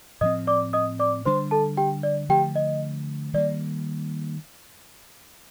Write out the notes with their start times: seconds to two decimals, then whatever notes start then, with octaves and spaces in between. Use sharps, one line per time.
0.21 A2 F3 C4 D#5 D#6
0.47 D5 D6
0.73 D#5 D#6
0.99 D5 D6
1.25 D3 G3 D4 C5 C6
1.51 A4 A5
1.77 G4 G5
2.03 D5
2.29 D3 F3 A3 G4 G5
2.56 D#5
3.33 D#3 G3 A#3 D5